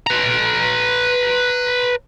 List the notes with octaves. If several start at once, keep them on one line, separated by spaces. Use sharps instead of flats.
B4 A#5